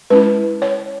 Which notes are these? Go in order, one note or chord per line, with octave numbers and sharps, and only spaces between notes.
G#3 C#4 E4 B4
C#5